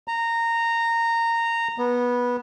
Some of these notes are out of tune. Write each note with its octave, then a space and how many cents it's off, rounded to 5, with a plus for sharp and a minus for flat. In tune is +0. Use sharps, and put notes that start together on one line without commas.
A#5 -15
B3 -15